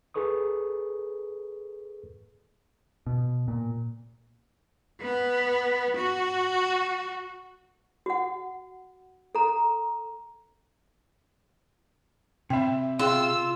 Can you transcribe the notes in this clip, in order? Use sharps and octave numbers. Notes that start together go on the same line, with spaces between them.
G#4 A4 B4 C#6 D#6
B2
A#2
B3
F#4
F#4 F#5
A4 A#5
C3 C4 E5 G5
F4 G#4 G5 E6